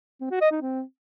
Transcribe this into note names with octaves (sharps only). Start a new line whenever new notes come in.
C4
F#4
D#5
D#4
C4